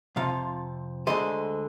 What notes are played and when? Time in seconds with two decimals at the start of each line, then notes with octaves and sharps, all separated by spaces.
0.16 F2 C3 F3 F5
1.07 D2 D3 G#3 C5 D#5